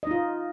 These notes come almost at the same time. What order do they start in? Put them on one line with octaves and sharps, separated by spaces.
D#5 D#4 F4